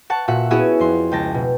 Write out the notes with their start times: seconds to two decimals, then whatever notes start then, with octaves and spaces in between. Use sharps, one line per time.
0.10 F#5 A5 C#6
0.28 A#2 F#4 E5 F#5
0.50 B3 C#4 E4 F#4 G#4 C#5
0.79 F2 C6
1.11 C#2 G5 A5 A#6
1.34 B2